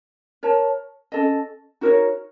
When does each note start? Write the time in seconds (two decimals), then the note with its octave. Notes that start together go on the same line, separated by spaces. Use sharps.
0.43 A#4 C#5 A5
1.12 C#4 A4 D#5
1.81 D#4 F#4 A#4 C#5